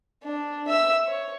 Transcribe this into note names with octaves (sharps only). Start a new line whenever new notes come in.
D4
E5 E6
C#5